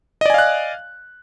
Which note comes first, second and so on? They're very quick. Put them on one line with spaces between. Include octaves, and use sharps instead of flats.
D#5 D5 G#5 F5 F#6